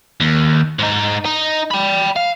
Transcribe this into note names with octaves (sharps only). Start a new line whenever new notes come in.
D#2
G#2 D#4
D#4
G5 B5
F5